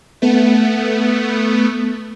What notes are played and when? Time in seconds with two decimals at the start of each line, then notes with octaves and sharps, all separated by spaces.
0.22 A3 B3